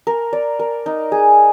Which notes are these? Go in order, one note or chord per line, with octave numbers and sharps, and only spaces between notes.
A#4
D5
A#4
D#4
G#4